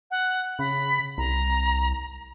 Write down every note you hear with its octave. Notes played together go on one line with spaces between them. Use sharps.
F#5
C#3 B5
C2 A#5